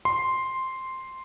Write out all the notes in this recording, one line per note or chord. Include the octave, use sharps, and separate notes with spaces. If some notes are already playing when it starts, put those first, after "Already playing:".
C6